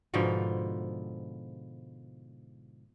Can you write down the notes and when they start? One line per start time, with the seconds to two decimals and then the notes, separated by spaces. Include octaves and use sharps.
0.14 G#2 B2 D3 F3